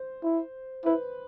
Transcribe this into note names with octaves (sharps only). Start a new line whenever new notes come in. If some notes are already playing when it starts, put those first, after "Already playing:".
Already playing: C5
E4
E4 B4